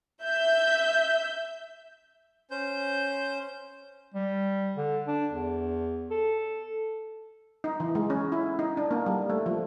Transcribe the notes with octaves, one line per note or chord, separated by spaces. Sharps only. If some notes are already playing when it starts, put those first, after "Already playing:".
E5 G6
C#4 C5 G6
G3
D3
D4
E2
A4
D#4
E3
G#3
C#4
E4
D#4
D4
A#3
G3
A3
F3